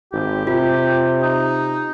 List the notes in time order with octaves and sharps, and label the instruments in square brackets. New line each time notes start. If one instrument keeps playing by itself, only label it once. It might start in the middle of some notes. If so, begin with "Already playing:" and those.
[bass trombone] G#1 [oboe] G4
[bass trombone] C3 [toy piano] F4
[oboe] D#4